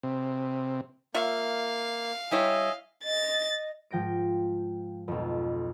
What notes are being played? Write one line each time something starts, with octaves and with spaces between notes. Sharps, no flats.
C3
A#3 F4 C#5 E5 F5
G3 E4 C#5 D#5 E5 G#5
D#5 A6
G#2 F3 G5 A#6 D7
B1 F2